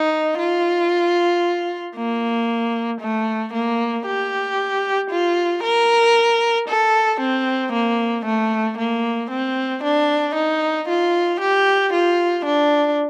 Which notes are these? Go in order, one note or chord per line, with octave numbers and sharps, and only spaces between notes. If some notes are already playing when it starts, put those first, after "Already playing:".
Already playing: D#4
F4
A#3
A3
A#3
G4
F4
A#4
A4
C4
A#3
A3
A#3
C4
D4
D#4
F4
G4
F4
D4